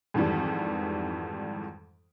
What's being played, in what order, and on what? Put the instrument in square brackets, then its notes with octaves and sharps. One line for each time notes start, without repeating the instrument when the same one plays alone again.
[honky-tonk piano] F2 G#2 D#3 E3 G3